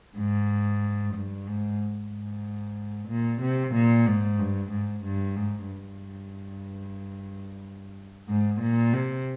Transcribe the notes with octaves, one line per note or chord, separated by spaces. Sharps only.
G#2
G2
G#2
G#2
A#2
C3
A#2
G#2
G2
G#2
G2
G#2
G2
G#2
A#2
C3